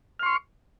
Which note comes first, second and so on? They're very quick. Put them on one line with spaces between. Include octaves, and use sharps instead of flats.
F6 C6 C#6